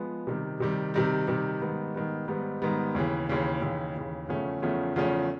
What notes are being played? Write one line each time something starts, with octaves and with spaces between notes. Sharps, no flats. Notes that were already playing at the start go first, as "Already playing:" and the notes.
Already playing: F3 G#3 B3
C3 D#3 G3
C3 D#3 G3
C3 D#3 G3
C3 D#3 G3
G#2 D#3 G3 B3
G#2 D#3 G3 B3
G#2 D#3 G3 B3
G#2 D#3 G3 B3
D#2 C#3 E3
D#2 C#3 E3
D#2 C#3 E3
D#2 C#3 E3
E2 C#3 F3 A3 C#4
E2 C#3 F3 A3 C#4
E2 C#3 F3 A3 C#4